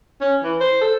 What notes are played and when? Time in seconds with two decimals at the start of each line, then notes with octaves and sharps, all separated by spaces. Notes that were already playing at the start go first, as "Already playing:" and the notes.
0.21 C#4
0.44 E3
0.61 C5
0.81 A4